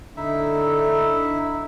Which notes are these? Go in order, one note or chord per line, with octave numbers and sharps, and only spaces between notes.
D3 D#4 E4 E5